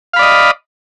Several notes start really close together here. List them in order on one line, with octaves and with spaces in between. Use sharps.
F5 B5 D5 D#5